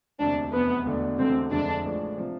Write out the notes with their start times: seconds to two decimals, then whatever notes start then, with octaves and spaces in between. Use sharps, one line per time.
0.19 E1 D2 C3 D4
0.52 F1 E2 C3 B3
0.85 E1 E2 D3 A3 D4
1.19 E1 E2 D3 A3 C4
1.51 F1 F2 D3 G#3 D4
1.85 A1 A2 F3 G#3 D4
2.18 C3 F3